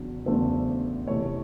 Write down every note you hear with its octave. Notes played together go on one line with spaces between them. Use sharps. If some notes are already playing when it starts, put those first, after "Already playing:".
Already playing: E2 C#3 F#3 D4
E2 C#3 F#3 A3 D4 C5
C3 E3 A3 C#5